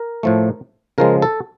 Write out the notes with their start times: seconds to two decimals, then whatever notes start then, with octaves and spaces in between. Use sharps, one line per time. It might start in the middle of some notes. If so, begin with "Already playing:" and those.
Already playing: A#4
0.23 A2 F3 A3
0.98 C#3 F3 G#3 A#4
1.22 A4